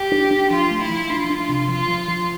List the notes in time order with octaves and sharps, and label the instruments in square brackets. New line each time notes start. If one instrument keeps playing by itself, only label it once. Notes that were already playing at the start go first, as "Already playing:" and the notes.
Already playing: [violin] G4
[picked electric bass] D4
D4
[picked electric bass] F3 [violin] F4
[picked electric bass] A3
[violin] E4
[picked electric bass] F3
[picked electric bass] D4 [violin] F4
[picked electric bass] D4
C3
[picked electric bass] F3 [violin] F4
[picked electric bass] F3
F3